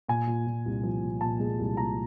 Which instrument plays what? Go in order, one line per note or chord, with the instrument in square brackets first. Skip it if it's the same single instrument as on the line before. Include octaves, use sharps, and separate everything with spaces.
[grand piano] A#2 G#5
A#2
A#2
C2
F3
A#2
A#2 A5
G#3
C2
A#2 A#5